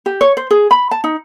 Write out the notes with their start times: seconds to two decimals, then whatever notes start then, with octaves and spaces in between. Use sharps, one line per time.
0.06 G4
0.21 C#5
0.37 C5
0.51 G#4
0.71 B5
0.91 A5
1.04 D#4